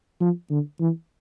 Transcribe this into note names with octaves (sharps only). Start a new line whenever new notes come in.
F3
D3
E3